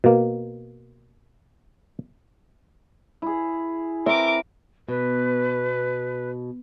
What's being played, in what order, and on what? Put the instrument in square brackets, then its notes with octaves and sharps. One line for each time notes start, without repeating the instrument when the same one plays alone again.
[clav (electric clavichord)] B2 A#3
[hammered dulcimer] E4 G#4
[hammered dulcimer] C4 [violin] A#4 D6 [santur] E5
[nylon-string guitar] B2 [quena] B4